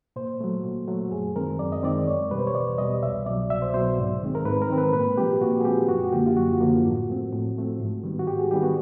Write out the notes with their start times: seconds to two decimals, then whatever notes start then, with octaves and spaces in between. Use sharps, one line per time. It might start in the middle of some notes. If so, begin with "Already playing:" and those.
0.16 A#2 C5
0.40 F#3 A3
0.64 A#2
0.87 F#3 A3
1.12 F#2 G#4
1.36 D#3 G#3 C4 A#4
1.59 F#2 D5
1.72 D#5
1.83 D#3 G#3 C4 D5
2.07 E2 C#5
2.31 B2 G3 B4
2.39 C5
2.47 C#5
2.54 E2 D5
2.78 B2 G3 D#5
3.03 C2 E5
3.26 B2 F#3 D5
3.50 C2 E5
3.62 C5
3.74 B2 F#3 C5
3.98 G#2
4.22 D#3 G#3 C4
4.35 A#4
4.45 G#2 B4
4.62 A#4
4.70 D#3 G#3 C4
4.78 B4
4.93 A#2 B4
5.17 F3 G#3 C4 G4
5.41 A#2 F#4
5.61 G#4
5.65 F3 G#3 C4 G4
5.88 F#2 F#4
6.12 D3 F3 A#3 G4
6.26 F4
6.36 F#2 F#4
6.61 D3 F3 A#3
6.84 A2
7.08 F3 A3 C4
7.32 A2
7.55 F3 A3 C4
7.80 G#2
8.03 D#3 G3 B3
8.19 F#4
8.27 G#2 G4
8.39 G#4
8.51 D#3 G3 B3 G4
8.63 F#4